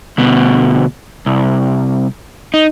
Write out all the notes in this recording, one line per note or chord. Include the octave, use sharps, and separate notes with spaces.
D2 B2
C2
D#4